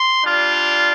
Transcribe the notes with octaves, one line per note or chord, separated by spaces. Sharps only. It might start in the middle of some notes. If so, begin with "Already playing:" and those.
Already playing: C6
G3 D4 F4